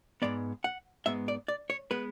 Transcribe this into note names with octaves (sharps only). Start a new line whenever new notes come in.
G#2 G#3 B3 D5
F#5
G#2 G#3 B3 E5
D5
D5
C#5
G#3 B3 B4